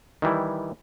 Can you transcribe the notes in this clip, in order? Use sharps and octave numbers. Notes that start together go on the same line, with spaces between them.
D#3 E3 G3 E4